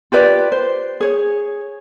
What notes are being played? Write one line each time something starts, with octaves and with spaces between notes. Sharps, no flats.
F4 G4 B4 D5
C5
G#4 C#5